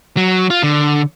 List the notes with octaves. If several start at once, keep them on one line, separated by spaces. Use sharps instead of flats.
F#3
F4
D3